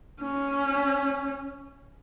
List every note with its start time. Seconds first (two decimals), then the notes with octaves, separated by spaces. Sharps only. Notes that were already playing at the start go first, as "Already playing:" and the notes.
0.22 C#4